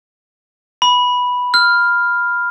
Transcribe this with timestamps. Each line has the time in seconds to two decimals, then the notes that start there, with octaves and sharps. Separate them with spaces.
0.82 B5
1.54 F6